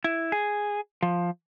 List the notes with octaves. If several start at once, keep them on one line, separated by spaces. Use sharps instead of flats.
E4
G#4
F3